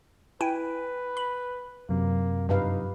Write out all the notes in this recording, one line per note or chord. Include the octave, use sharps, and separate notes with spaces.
E4 B4 G5 G#5
B5
F#2 C3 F#3 A#3
G2 D#4 G4 B4 F5